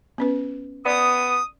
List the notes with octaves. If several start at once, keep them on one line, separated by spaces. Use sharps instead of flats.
B3 C#4 B4
B3 D5 D#6